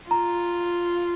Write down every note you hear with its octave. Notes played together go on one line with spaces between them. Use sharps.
F4 A#5